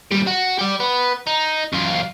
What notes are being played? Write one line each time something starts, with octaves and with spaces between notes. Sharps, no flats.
D#2 G3
F#4
G4 D5
B3
D#4
F#2 F4